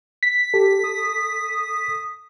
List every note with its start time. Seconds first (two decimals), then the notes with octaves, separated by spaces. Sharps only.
0.23 B6
0.54 G4 A4
0.84 D#6